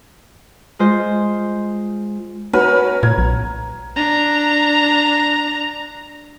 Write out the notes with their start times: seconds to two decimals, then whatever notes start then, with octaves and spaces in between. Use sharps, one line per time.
0.79 G#3 F4 C5
2.53 C#4 F#4 A#4 B4
3.03 A#2 G#6
3.18 B1
3.96 D4 A#5